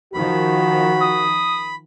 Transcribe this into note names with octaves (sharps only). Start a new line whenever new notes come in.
D#3 F3 F#4 B5
D#6